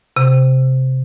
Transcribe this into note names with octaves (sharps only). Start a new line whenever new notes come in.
C3